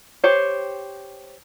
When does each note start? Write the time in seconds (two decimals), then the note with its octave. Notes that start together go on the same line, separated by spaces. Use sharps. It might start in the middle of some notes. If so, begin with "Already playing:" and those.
0.24 G4 C5 C#5